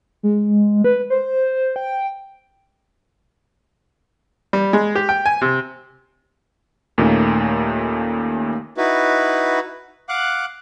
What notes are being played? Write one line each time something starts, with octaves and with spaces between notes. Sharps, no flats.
G#3
B4
C5
G5
G3
G#3
G4
G5
G#5
C3
D#2 A#2 A3 A#3 C#4 D#4
D#4 E4 F#4 B4
F5 F#5 D6 F#6